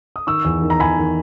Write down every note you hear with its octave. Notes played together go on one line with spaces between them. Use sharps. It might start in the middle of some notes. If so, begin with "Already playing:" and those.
D#6
D#3 C#6 E6
E2
D#3
A#5
E2 G#5 B5
D#3